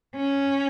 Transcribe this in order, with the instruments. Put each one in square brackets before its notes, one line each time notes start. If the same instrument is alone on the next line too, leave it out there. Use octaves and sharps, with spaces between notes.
[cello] C#4